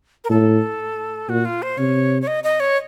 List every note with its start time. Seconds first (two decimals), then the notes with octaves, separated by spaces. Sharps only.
0.24 A#4
0.30 A2 A4
1.29 A#2 F#4
1.45 F4
1.62 C5
1.78 C3 C#5
2.22 C#5
2.27 D#5
2.44 D#5
2.60 C#5